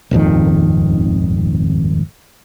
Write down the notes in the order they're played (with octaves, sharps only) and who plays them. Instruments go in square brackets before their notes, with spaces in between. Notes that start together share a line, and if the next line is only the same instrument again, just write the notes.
[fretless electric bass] D#1 G#1 F2 D#3